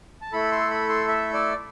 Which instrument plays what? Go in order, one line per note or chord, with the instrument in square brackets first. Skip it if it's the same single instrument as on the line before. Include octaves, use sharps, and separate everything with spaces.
[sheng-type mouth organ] A5
A3 E4 A4 B5
C6
B5
C6
E5
D5